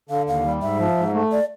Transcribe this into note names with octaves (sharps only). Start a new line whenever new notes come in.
D3 F5
D#2 F5
G3
G#2 E5
F3
G#2
A3
D5